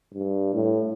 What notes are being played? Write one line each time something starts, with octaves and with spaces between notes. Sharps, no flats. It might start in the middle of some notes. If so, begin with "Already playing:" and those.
G2
A2